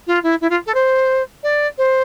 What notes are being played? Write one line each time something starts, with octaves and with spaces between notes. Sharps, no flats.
F4
E4
E4
F4
A4
C5
D5
C5